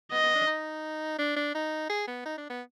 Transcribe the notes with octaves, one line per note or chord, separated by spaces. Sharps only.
B3 D#5
B3
D4
D#4
D4
D4
D#4
G#4
B3
D#4
D4
B3